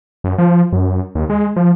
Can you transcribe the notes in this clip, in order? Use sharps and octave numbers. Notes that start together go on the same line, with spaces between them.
F#2
F3
F#2
D#2
G#3
F3